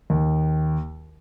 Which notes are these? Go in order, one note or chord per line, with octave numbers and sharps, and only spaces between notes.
D#2